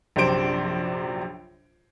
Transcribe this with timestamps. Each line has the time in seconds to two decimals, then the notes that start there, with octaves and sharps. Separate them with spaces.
0.16 A#1 F#2 C3 D4 C5 D7